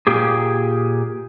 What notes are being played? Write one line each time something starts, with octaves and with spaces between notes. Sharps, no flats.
A#2 G4 G#4